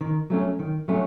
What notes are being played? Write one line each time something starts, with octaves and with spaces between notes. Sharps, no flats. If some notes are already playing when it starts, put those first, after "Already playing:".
D#3
F#3 A3 C#4
D#3
F#3 A3 C#4